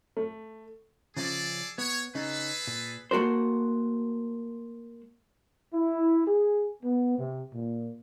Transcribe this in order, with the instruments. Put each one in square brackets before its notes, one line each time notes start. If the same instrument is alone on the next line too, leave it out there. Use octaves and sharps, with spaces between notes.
[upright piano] A3
[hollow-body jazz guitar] C#3 F3 C#4 [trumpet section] G#4 A4 D5
[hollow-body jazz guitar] B3 [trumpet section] C#5
[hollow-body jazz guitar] C#3 C#4 D#4 [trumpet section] G#4 A4 B4
[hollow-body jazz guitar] A#2
A3 A#3 F#4 A#4 C5
[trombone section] E4
G#4
B3
C3
A#2